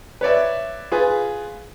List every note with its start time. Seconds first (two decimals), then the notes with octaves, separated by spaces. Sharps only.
0.21 B4 C#5 D5 E5
0.92 F4 G#4 B4